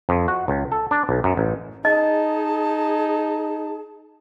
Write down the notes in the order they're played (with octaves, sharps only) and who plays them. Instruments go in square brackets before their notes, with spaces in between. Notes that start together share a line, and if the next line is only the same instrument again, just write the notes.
[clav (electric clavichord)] F2
F#4
C#2
A4
D4
B1
F#2
A1
[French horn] D#4 [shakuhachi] G#4 [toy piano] D#5 [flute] A5